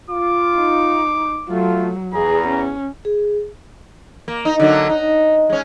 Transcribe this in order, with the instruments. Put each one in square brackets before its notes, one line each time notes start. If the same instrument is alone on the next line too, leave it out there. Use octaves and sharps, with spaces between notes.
[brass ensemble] F4 [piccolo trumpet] D6
[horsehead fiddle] D#4
[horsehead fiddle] F#3 [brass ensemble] A3 F4
[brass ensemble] E2 [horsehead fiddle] G#4 [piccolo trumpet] A#5
[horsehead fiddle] C#4
[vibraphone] G#4
[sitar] A#3
D#4
D3 F#3 A#3
D#4
G#3 C#4